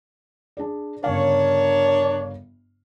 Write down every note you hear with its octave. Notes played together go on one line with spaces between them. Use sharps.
D4 G#4 D5
G1 C#3 D4 A#4 C#5 F5